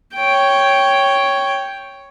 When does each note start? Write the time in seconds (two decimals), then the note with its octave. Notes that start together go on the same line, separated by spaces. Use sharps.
0.15 C#5 G5